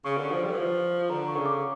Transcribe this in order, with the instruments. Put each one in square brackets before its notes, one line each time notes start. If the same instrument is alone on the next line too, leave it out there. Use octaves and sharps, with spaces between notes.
[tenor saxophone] C#3 [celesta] C#6
[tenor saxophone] D3
F3
G3
E3
F3
[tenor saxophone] D3 [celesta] A#5
[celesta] C#6
[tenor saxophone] C#3
[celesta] D6